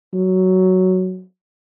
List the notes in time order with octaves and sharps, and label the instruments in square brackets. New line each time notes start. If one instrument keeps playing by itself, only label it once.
[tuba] F#3